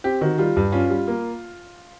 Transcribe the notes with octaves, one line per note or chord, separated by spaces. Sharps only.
C4 G4
D#3 F#4
G3 F4
G2
C#4 F4
G3
A#3